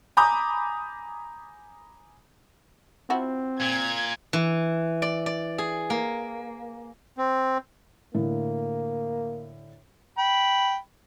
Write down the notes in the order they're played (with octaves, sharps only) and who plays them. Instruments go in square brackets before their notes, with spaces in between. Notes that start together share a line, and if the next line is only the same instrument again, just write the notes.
[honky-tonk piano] G#5 A#5 B5 D6 D#6 G6
[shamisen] F3 E4 F#4 [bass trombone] C4
[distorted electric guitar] A#2 [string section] G#6
[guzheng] E3
D5
D5
G#4
A#3
[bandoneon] C4
[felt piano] A2 D3 [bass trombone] A#3
[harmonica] G5 B5